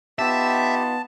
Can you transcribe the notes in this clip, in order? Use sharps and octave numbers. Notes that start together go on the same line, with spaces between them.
B3 D#4 F4 G4 E5 A5